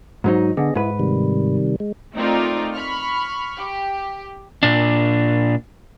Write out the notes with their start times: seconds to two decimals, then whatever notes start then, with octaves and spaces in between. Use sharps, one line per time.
0.24 G#2 F#3 D#4
0.57 D3 B3 G#4 D#5
0.75 G#2 E4 B4
0.99 C3 D#3 G3
1.80 G#3
2.15 A3 C4 D#4 F4 A#4 D5
2.73 B5 C#6 F6
3.58 G4
4.63 A#2 D4